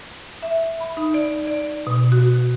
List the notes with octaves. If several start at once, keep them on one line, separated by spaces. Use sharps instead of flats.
E5
B5
D#4
D5
D5
B2
F#4